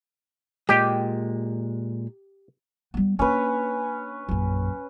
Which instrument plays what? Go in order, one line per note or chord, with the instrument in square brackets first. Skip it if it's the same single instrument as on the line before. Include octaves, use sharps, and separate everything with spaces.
[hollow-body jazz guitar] A#2 G#3 [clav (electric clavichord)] G4
[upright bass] G3 B3
[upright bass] A#3 D4 [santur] C#4 B4
[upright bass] A#1 F#2